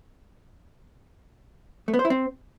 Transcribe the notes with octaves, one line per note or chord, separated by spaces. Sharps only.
A3
B3
C5
E4
C4